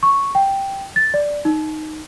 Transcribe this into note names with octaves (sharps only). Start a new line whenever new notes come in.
C#6
G5
A6
D5
D#4